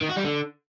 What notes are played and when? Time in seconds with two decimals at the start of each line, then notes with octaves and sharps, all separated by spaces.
0.02 D#3
0.10 F#4
0.17 G3
0.25 D3